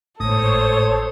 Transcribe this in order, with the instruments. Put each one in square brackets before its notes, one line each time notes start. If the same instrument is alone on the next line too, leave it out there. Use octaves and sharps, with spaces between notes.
[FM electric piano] G#1 A2 [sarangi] A4 [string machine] C5 C#5 [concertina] D#6